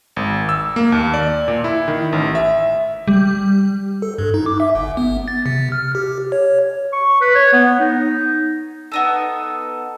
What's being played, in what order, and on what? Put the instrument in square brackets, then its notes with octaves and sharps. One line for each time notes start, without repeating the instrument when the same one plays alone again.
[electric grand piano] G#1
E6
A#3
D#2
D5
A#2
E4
D#3
A1
E5
[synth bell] G3
[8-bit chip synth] A4
G2
D#4
D6
E5
G1
B3
A6
C3
F6
G4
C#5
[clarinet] C#6
B4
C#5
B3
D#4
[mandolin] B3 D#4 A4